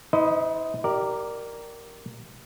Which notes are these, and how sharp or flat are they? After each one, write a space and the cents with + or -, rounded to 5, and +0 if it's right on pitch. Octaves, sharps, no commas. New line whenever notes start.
E4 -45 C5 -45 D#5 +0
G4 -20 A#4 +0 D5 +5